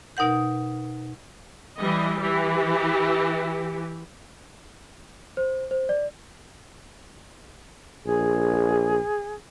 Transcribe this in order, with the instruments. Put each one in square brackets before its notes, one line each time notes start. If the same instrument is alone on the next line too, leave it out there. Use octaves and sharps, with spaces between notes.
[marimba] B2 D#4 A#4 F#5 G6
[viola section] E3 G3 D#5
E3 G4
[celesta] C5
C5
D5
[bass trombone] A#1 [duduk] G#4